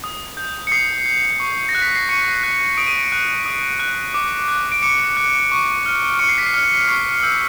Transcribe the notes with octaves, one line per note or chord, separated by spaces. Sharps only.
D#6
G6
C#7
D#6 C7
G6
C#6
A#6
F#6
B6
C7
C#6 C#7
F#6
D#6 D7
D#7
D7
F#6
D#6
F#6
D6
F#6
D7
D6 C#7
F#6
C#6
F6
C#6 C#7
C7
B6
C7
F6
C#6 C7
E6 G6